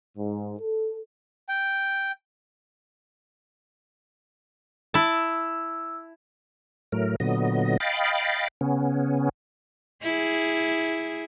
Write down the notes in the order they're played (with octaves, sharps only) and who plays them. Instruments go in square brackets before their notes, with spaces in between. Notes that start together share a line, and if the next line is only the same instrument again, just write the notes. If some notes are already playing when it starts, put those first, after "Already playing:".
[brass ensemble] G#2
A4
[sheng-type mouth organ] G5
[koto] E4 A5 [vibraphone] E6
[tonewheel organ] A2 F#3 A3 A#4
A#2 D3 F#3 B3 D#5
D#5 F5 G5 B5 A6
C#3 B3 C#4
[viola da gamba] E4 G#4